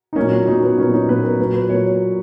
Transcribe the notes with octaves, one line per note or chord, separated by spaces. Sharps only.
D#4
A#2 F#3 A#3 C#4
C#4
A#2 F#3 A#3 D#4
B3
A#2 F#3 A#3 C#4
D#4
A#2 F#3 A#3 B4
A#4
A#2 F#3 A#3 B4
B4
A#2 F#3 A#3 C#5